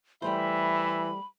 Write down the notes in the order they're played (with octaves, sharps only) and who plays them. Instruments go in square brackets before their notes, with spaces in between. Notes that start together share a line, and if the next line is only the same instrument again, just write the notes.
[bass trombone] E3 [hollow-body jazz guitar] G3 A3 C5 [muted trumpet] E5 [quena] B5